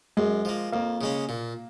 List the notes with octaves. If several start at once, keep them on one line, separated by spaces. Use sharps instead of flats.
F#2 G#3
F3 A#3
F2 A#3
C#3 G#3 C#4
A#2